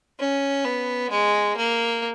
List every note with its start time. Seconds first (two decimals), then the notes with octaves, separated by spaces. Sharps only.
0.19 C#4
0.65 B3
1.10 G#3
1.57 A#3